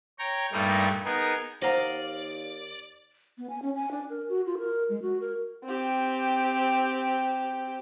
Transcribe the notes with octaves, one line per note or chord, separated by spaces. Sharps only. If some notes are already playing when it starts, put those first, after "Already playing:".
C#5 G5 A#5
G2 A#2 G3 A3 A#3 D#4
B3 D#4 G#4 A#4
D#2 C5 D5 D#5 F5 F#5 A#5
B3
G#5
C#4
G#5
D4
A#4
F#4
F4
A#4
G#3
F#4
A#4
C4 G4